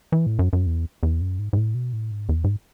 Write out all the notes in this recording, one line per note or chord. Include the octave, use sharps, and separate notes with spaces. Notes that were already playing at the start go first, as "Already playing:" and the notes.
E3
A2
F#2
F#2
E2
E2
F#2
G#2
G#2
A2
B2
A2
G#2
E2
G#2